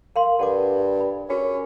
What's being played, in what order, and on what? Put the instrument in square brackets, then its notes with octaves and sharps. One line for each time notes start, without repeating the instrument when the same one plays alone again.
[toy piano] A#4 F5 C6
[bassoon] G2 [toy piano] A4 F#5 D6
[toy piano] B5
[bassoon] C#4 [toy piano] F#4 G#4 A#4